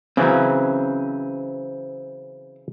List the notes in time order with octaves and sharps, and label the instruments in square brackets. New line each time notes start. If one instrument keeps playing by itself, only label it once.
[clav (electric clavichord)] C#3 E3 F#3 [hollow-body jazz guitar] C4 C#4